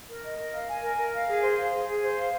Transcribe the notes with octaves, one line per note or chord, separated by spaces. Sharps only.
A#4
D#5
A#4
F5
G#5
A#4
A#4
F5
G#4
C5
F5
G#4
G#4
C5
F5